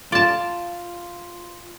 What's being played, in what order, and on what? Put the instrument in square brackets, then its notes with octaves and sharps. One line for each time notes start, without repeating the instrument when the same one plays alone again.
[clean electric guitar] F4 [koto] D5 A5